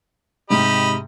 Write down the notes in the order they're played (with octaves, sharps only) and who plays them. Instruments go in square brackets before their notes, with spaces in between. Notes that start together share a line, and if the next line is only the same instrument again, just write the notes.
[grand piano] G#2 C3 [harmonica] G4 D#5 B5